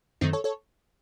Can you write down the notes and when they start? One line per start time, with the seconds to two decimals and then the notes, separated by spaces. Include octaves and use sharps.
0.21 F#2 D#3 A3 C4 D#4
0.33 A4 C#5
0.44 A4 C#5